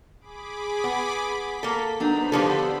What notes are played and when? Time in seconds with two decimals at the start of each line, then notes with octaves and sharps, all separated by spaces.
0.20 G#4 B5 D6
0.84 B3
1.29 B6
1.63 A#3 A4
2.00 F#3 B3 D4 D#4 C5 B5
2.32 D3 F3 G4 A4 D5